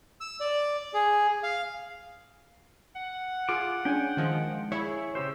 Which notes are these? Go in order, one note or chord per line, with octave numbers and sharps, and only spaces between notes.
E6
D5
G#4
F5
F#5
F4 G#4 D6
C#4 D4 G5 G#5
D#3 F3 G#3
E4 G#4 C#5
C#3 G4 C5 E6